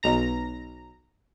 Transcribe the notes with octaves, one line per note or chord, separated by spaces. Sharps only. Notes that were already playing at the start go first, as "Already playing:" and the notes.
B1 A#5 A#6